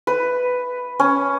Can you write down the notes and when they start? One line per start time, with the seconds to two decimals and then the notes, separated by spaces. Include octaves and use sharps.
0.07 B4
1.00 C#4